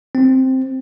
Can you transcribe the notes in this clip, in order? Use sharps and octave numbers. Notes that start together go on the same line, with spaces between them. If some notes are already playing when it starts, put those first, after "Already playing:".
C4